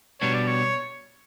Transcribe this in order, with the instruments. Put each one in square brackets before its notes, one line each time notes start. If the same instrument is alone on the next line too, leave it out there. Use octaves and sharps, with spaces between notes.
[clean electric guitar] B2 G3 B3 D4 [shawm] C#5
[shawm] D5
C#5